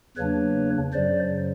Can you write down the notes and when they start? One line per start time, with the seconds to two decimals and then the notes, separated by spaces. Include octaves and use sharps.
0.17 E2 C#3 F#3 A#3 D4 B4 C#5
0.93 F#2 C#3 F#3 C5 D5